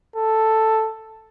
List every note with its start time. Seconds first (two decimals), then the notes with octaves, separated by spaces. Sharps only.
0.16 A4